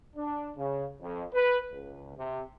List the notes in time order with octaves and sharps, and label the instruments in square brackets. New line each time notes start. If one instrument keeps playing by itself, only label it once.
[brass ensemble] D4
C#3
F2
B4
C#2
C3